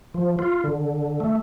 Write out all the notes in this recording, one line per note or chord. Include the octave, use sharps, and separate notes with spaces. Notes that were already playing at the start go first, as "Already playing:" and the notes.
F3
F4
D3
A3